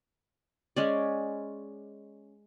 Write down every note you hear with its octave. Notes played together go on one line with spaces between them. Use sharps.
G#3 C#4 D5